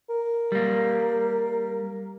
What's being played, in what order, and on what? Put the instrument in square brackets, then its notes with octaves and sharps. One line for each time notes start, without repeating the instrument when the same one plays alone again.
[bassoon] A#4
[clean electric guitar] G3 A#3